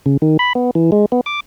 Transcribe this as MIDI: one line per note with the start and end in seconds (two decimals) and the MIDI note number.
0.06 0.17 49
0.22 0.37 51
0.39 0.53 83
0.55 0.71 59
0.75 0.91 52
0.92 1.06 56
1.12 1.21 59
1.26 1.40 86